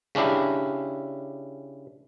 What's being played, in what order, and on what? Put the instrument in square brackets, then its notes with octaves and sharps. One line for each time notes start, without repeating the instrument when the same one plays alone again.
[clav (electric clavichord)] C#3 C#4 D4 E4 G4